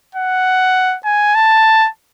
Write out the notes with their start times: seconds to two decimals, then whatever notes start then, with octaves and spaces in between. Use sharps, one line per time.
0.15 F#5
1.05 G#5
1.35 A5